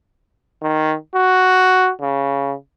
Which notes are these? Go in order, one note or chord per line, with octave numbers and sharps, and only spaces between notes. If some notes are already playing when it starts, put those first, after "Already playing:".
D#3
F#4
C#3